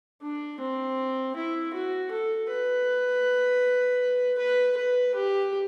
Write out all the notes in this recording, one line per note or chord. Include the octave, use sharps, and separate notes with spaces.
D4
C4
E4
F#4
A4
B4
B4
B4
G4